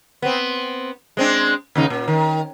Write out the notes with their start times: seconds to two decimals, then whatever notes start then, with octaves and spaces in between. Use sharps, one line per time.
0.22 B3 C4
1.17 G#3 C4 D4
1.75 D#2 C#3 D#4
1.90 A#2
2.08 D#3